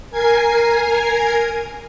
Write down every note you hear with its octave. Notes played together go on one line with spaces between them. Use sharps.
A#4 G#5 G#6 C7